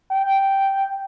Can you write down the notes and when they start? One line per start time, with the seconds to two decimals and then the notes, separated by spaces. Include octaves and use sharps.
0.12 G5